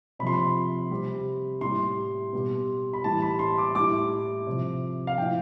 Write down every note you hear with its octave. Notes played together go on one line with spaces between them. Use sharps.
C3 F3 B5 C6
B5
C3 G3
A2 G3 C6
B2 G3
B5
A2 E3 G3 A5
B5
C6
D6
A2 G3 D6
C3 F3
F5
A2 F3 G5